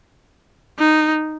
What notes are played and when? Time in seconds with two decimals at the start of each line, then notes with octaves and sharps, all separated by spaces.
0.79 D#4